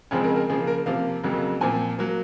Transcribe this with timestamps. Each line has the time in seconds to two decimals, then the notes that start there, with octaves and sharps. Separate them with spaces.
0.11 F2 C#3 F3 G#3 C4 C#4
0.24 A#4
0.36 A#4
0.49 C#3 F3 A#3 G#4
0.67 A#4
0.86 C3 F3 A#3 F5
1.23 F2 C#3 F#3 A#3
1.61 A#2 F3 C4 G#5
1.99 F#3 A#3